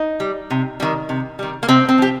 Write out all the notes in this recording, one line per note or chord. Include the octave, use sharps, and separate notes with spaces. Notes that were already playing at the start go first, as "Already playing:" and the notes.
Already playing: D#4
G3
C3
D#3 G3
C3
D#3 G3
A#3
C3 C4
C4
F3 G4